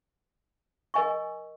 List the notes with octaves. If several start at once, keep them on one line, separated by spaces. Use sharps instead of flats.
A#4 D#5 G#5 C#6